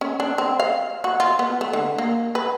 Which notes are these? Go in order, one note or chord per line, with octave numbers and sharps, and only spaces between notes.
C#4
D4
C4
F5
F#4
F4
B3
A3
D3
A#3
B4